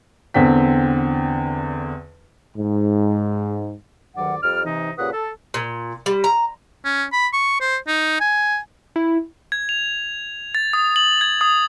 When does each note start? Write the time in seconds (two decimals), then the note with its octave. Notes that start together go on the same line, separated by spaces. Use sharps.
0.34 E2 D3 C4 G5 B6
2.57 G#2
4.16 D2 G2 D#3 F#3 D5 F#5
4.42 F2 G3 D5 F6
4.65 C3 E3 D#4
4.98 A#2 C#3 G4 B4 F#5 D#6
5.13 A4
5.54 A#2
6.06 G3
6.24 A#5
6.85 C#4
7.13 B5
7.33 C#6
7.60 C5
7.87 D#4
8.20 G#5
8.96 E4
9.52 G#6
9.69 F7
10.55 A6
10.73 D#6
10.96 F#7
11.21 G#6
11.41 D#6